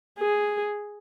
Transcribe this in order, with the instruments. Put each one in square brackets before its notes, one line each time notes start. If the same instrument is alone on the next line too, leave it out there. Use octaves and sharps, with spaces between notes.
[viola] G#4